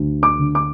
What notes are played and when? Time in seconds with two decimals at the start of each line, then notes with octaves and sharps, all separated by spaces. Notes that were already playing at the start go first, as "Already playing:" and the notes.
Already playing: D2
0.23 D6
0.39 D3
0.55 D6